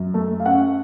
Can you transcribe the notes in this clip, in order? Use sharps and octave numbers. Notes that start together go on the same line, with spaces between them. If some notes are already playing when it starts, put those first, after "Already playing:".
Already playing: F#2
A3
F5
C#4 F#5